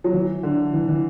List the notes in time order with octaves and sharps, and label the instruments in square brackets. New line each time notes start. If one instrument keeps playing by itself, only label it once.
[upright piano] F#3
E3
D3
E3
E3